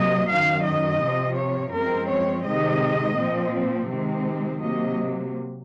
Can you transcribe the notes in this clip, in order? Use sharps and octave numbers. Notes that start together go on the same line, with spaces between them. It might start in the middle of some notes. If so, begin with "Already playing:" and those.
Already playing: C3 F#3 A#3 D#5
F#2 D#3 F#3 F5
D#5
C3 F3 C4
C#5
F#2 F3 G#3 C4 A#4
C#5
C3 D#3 G#3 D#5
A#2 F3 C4
C3 D#3 G#3 C4
C3 F#3 A#3 D#5